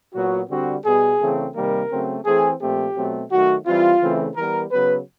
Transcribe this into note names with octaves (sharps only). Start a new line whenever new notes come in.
A#2 F#3 B3 F#4
D3 G3 C4 F#4
B2 G3 B3 G#4
C#3 E3 A3 C4
C3 D#3 G3 A#3 A#4
C#3 F#3 A3 C4
E3 A3 C4 G#4
A#2 F3 A3 C4 G4
B2 F#3 A3 C4
D#3 F#3 A3 F#4
E3 G3 C4 F4
C#3 E3 A3 C4
E3 G3 B3 A#4
C#3 F#3 B3 B4